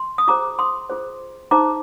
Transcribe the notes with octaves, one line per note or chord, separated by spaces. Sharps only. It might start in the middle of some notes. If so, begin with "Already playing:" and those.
Already playing: C6
D#6
F4 G#4 C5 A#5 D6
C6 D#6
F4 G#4 C5
D#4 G#4 C5 A#5 D6